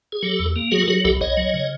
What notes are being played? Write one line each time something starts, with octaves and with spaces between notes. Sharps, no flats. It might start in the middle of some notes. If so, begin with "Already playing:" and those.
G#4
F#3 G4 A4
E2
A#3
F#3 F#4 G#4
A4
F#3 F#4 G#4
B1 G4 A4
B1 C#5 D#5
F#3
C#3